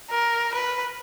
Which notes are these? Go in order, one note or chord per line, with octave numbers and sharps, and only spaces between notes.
A#4
B4